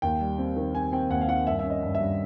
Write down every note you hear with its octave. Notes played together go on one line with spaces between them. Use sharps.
D#2 G5
G3
C4
D#3
C4 G#5
C4 G5
D#2 F#5
F5
D#3 F#5
G2 E5
C#4 E5
D#5
G2
E5
G2